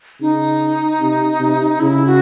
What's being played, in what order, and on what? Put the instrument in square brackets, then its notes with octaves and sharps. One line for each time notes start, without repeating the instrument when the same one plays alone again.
[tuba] C#3 [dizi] D#4
[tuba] C3
C3
[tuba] C#3 [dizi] E4
[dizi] F#4